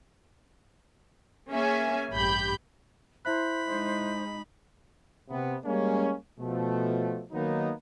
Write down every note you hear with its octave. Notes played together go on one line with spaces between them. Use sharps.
A#3 C#4 G#4 E5 G#5
A1 G2 G4 B5 G6
E4 C5 E5 B5 F#6
G#3 D#4
C3 B3
G3 G#3 A#3 C#4
B2 F3 A3
D#3 F#3 A#3 B3 D#4